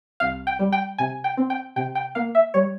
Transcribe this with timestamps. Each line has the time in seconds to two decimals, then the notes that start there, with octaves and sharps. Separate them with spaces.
0.20 C2 F5
0.47 G5
0.59 G3
0.72 G5
0.98 C3 G#5
1.24 G5
1.37 C4
1.50 G5
1.76 C3 G5
1.95 G5
2.15 A#3 F5
2.35 E5
2.54 G3 C#5